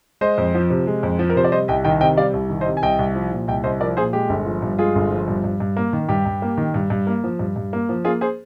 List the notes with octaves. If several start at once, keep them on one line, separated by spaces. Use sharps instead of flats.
G#3 C5 D#5
F2
F3
C3
G#3
F2
F3
A#4
C3 C5
D5
G3 C5 D#5
C2 D#5 G5
D#3 D#5 G5
C3 D#5 G5
G3 D5 F5
C2
D#3
C5 D#5
C3
G#5
C2 D#5 G5
C2
F3
A#2
C2 D#5 G5
C2 C5 D#5
F3 A#4 D5
A#2 G#4 C5
G#3 G4
G1
F3
G2
G#3 F4 G#4
G1
F3
G2
G2
G2
A#3
D#3
G2 G4
G2
A#3
D#3
G2
G2
A#3
F3
G2
G2
A#3
F3
A#3 F4 G#4
G#4 C5